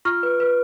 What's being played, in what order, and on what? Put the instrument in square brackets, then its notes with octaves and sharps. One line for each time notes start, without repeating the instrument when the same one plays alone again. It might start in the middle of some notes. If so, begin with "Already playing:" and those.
[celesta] F4 C#6 F6
B4
B4